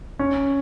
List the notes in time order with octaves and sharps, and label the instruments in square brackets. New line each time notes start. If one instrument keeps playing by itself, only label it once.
[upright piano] C#4